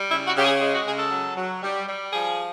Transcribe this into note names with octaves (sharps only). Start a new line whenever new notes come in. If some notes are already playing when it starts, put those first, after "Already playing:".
Already playing: G3
C#3 E4
F#4
C#3 G4
G#4
G#3
F#4
C#3 G#4
A4
F#3
F#3
G3
G3
F3 G#4